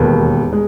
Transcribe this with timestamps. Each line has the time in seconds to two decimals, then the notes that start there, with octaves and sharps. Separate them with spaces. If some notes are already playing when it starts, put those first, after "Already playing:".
Already playing: E1 D#2 D#3 B4
0.53 G#3